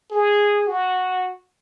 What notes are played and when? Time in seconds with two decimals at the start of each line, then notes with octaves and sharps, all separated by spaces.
0.11 G#4
0.68 F#4